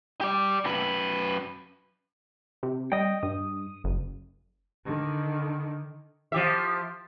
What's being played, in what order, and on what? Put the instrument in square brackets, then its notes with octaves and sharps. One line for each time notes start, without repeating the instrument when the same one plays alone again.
[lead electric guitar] G4 D5
F#2 B4
[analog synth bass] C3
[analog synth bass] G3 [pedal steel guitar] D#5 G5
[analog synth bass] G2 [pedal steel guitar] D#6
[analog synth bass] F#1
[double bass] D3 D#3
[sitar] F3 G4 E5